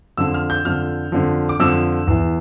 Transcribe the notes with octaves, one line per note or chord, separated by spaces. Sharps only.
F2 D3 F3 E6
F6
G6
F2 D3 F3 F6
F2 D3 F3
D6
F2 D3 F3 E6
E2 E3